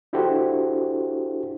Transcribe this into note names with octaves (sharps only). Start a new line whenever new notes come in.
D4 E4 F#4 G4 A4 C5